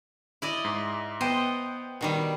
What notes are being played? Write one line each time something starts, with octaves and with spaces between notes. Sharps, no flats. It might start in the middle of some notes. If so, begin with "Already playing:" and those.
E4 D5 D#5
G#2
B3 C5 D#5 G5
B2 D#3 G3